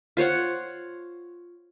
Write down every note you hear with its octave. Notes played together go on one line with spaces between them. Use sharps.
F4 C5 C#5 F#5